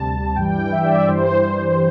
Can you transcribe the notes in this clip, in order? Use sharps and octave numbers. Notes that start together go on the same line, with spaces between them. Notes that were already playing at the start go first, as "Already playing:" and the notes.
Already playing: D2 C3 G3 A5
G2 E3 G3 G5
E5
D5
D5
G2 E3 G3 C5